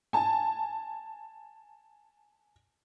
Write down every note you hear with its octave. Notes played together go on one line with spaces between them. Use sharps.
G#5 A5